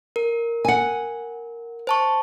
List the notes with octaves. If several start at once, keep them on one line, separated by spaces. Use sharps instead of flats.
A#4
F#5 G#5
C5 A5 C#6